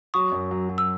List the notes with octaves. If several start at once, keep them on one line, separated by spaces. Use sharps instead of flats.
F#3 C#6 D#6
F#2
F#3
F#3
E6